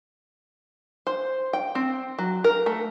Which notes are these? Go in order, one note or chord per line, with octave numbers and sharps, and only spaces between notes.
C5
G5
C4
F#3
A#4
A3